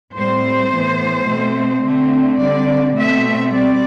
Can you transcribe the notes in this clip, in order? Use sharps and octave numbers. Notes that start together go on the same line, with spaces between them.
A2 G3 C4 C5
A2 E3 B3
B2 A3 C4
D3 A3 C4
D3 G3 C4 D5
B2 A3 C4 E5
G3 C4 D5